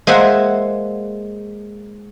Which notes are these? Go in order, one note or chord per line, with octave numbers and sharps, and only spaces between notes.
G#3 A#3 C5 E5 F#5